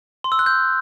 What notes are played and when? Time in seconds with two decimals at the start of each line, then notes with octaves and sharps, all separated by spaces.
0.24 C6
0.32 E6
0.39 F#6
0.46 G6